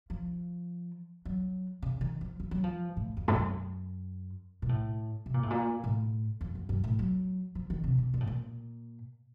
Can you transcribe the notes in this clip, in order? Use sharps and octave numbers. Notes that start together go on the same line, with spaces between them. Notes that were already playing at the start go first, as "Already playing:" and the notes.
F3
F#3
C#3
D#3
F3
F3
F#3
F3
A2
F2
A2
F#2
A#2
A2
C3
A#2
A2
A#2
A2
F2
F#2
F#2
A2
F#3
F3
D#3
C3
C3
A#2
A2
A#2